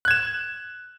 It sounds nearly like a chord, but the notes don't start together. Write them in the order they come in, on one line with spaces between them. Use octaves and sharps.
F#6 G#6 E7